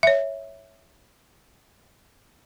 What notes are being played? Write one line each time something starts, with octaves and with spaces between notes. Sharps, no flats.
C#5 E5